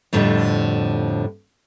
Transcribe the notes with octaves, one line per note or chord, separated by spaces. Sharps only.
F2 A2 D3 F3 G3